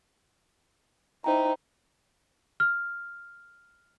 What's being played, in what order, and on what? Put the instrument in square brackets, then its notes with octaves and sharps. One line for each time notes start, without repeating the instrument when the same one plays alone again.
[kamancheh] D#4 E4 [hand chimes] C5 G5 A#5
[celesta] F6